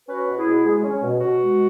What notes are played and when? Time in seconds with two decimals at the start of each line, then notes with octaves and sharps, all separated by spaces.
0.08 C#4 F#4 B4
0.28 B2
0.37 E4 G#4
0.46 B2
0.65 G#3
0.84 C#4
1.03 B2
1.20 B2 F#4
1.40 G#3